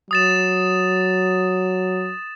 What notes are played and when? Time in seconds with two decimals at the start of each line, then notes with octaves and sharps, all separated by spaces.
0.11 F#3 D#6 A6 E7